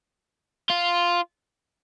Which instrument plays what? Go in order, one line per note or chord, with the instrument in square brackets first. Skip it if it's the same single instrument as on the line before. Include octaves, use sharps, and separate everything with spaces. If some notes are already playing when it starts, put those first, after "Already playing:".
[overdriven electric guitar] F4